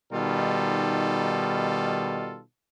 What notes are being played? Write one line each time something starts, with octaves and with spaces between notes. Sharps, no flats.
B2 D#3 G3 D#4 F4 A4